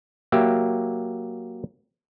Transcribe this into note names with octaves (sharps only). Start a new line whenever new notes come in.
F#3 A#3 G4 E5